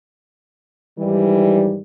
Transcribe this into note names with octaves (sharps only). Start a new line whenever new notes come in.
G#2 D#3 E3 G3